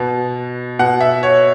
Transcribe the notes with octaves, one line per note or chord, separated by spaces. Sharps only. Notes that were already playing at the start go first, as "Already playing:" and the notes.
Already playing: B2 F#5
B2 F#5
E5
C#5